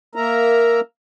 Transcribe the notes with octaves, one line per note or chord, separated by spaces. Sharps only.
A#3 A#4 E5 A#5